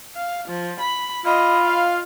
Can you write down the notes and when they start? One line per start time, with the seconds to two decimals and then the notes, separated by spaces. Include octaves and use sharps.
0.16 F5
0.48 F3
0.80 B5
1.26 F4 D#5 B5
1.66 F5